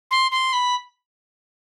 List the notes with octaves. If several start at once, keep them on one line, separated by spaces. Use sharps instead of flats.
C6
C6
B5